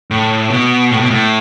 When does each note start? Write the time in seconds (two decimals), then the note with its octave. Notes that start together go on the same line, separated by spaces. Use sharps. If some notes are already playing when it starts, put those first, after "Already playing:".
0.11 A2
0.50 B2
0.90 A2
1.00 B2
1.10 A2